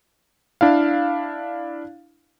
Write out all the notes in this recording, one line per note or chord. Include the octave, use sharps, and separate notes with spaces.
D4 E4 F5